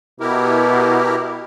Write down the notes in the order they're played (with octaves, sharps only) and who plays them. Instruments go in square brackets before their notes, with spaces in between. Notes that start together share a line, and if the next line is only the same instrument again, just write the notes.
[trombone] B2 [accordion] E4 G4 A#4